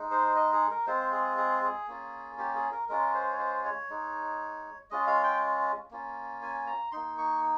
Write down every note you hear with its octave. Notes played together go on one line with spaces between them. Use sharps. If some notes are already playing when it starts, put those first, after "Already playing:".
Already playing: G#3 D#4
C5
D#5
G#4
A#4
G#3 C4 F4 C5
G#4
G#4
G#4
A#3 C#4 F4
G4
G#4
A#4
G#3 C#4 F4 A#4
C5
C#5
C5
C#5
G#3 D#4
G#3 C#4 F4 D#5
F5
G5
A#3 C#4 F4
G#5
A#5
A#3 D#4 C6
C#6